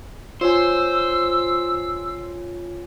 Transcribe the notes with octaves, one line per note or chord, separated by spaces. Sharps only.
F4 C5 C#5 G#5 E6